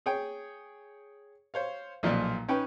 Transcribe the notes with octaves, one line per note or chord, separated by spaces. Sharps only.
G#4 C#5 G5
C5 C#5 F5
B1 A#2 F3 D5
C#4 D#4 B4 G5 C#6